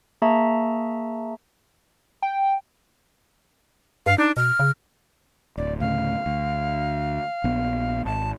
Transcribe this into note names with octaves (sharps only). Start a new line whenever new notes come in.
A#3 G#4 E5 A5 A#5 C#6
G5
G2 F5
D4 D#4
B2 F6
C#3
D1 D5
D2 A2 C#3 F5
D2
A#1 B3
G#1 A5